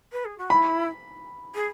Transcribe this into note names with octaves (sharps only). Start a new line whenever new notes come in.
B4
G#4
F#4
E4 B5
G#4